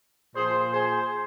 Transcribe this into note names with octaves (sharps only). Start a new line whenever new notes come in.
A#2 F3 G#4 C5
G#4 C5